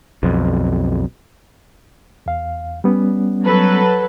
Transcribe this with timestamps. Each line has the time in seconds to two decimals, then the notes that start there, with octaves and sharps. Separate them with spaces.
0.23 B1 F2
2.26 E2 F5
2.84 G3 B3 C#4
3.45 F#3 A4 B4